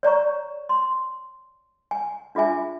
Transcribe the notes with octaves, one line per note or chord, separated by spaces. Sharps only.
C#5 D5 A#5 C#6
C6
G#5
D4 F4 G#4 E5 G#5